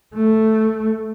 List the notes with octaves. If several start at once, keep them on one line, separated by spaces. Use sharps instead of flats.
A3